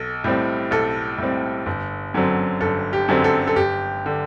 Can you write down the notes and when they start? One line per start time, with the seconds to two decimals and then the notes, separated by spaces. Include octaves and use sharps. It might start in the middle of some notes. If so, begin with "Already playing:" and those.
Already playing: B1 A4
0.24 A2 G3 C4
0.71 B1 A4
1.18 A2 G3 C4
1.66 G1
2.14 F#2 D3 F#3 C4
2.61 G1 A4
2.93 G4
3.08 F#2 D3 F#3 C4
3.24 A4
3.48 A4
3.56 G1 G4
4.06 D3